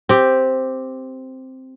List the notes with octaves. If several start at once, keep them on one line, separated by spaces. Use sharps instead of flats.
C4 G4